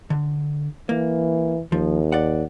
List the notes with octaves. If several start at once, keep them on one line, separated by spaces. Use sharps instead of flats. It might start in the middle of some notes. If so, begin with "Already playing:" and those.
D3
E3 A#3
D#2 F3
D5 F#5